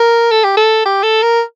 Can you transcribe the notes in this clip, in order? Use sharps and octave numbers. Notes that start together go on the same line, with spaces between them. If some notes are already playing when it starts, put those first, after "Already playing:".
Already playing: A#4
A4
G4
A4
G4
A4
A#4